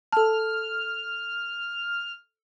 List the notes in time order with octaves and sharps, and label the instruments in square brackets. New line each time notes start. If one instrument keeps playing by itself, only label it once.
[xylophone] A4 A5 [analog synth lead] F6